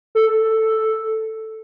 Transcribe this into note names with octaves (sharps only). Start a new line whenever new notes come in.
A4